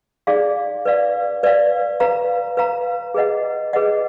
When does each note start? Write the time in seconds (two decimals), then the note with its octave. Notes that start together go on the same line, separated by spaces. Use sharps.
0.27 D#4 G#4 D5 F5
0.85 B4 D5 F5
1.43 B4 D5 F5
2.00 B4 F5 A#5
2.57 B4 F5 A#5
3.14 G#4 B4 D#5 F#5
3.73 G#4 B4 D#5 F#5